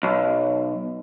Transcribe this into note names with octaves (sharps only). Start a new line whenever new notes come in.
B1